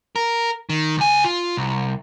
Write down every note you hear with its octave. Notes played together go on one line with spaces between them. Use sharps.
A#4
D#3
C#2 G#5
F4
C2